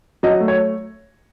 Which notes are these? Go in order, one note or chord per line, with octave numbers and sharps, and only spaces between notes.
F#3 D#5
A3
C#5